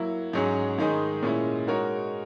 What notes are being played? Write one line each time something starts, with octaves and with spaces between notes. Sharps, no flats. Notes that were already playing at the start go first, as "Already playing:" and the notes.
Already playing: F#3 A#3 E4
G#2 F#3 C#4 G#4
G#2 D#3 G#3 D#4 G#4
A#2 G#3 C#4 E4
G#3 D#4 F#4 A#4 C#5